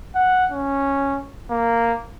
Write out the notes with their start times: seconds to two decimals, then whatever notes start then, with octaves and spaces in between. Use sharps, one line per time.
0.15 F#5
0.52 C#4
1.50 A#3